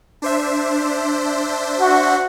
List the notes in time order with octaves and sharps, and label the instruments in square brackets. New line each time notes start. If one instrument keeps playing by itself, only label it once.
[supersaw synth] D4 C5 E5
[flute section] F#4